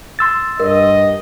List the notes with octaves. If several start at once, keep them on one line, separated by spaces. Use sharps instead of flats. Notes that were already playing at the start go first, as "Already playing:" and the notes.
C6 E6 A6
G2 A#4 D#5